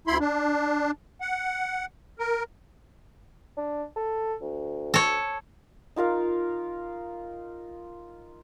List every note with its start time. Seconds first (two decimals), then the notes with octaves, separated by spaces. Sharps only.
0.07 D2 E4 B5 C6
0.20 D4
1.21 F#5
2.19 A#4
3.57 D4
3.96 A4
4.42 D2
4.94 A4 C#5
5.96 D#4 F4 A#4 F5